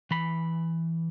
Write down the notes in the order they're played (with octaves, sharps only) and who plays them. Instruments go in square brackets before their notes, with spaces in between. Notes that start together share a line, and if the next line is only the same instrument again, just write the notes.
[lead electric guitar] E3 B5